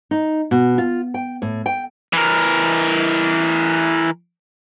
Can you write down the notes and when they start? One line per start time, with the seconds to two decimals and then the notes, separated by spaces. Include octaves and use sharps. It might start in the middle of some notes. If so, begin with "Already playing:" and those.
0.11 D#4
0.51 B2
0.78 F4
1.14 G5
1.42 A2
1.66 G5
2.13 E3 A#4